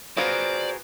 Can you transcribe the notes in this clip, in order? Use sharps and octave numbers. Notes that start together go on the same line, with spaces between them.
B3 F4 F#4 G#4 A#4 C5 D5